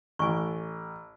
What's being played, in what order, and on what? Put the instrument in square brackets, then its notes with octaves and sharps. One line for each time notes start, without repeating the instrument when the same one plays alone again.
[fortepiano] A1 [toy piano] G#5 C#6